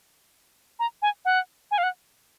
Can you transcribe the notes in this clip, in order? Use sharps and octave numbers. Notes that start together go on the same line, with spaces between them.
A#5
G#5
F#5
G#5
F5
F#5